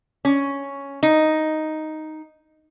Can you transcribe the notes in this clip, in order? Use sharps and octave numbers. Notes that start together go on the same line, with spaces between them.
C#4
D#4